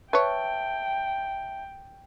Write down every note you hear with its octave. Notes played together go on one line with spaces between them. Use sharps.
B4 C#5 E5 G5 A5